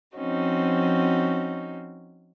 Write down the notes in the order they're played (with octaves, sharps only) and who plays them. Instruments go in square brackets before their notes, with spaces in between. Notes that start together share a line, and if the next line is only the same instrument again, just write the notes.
[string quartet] F3 C4 C#4 D#4 F#4